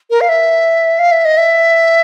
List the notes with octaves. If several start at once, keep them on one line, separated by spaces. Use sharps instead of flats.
A#4
F5
E5
F5
E5
D#5
E5